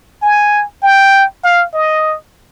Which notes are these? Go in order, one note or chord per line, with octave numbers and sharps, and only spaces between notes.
G#5
G5
F5
D#5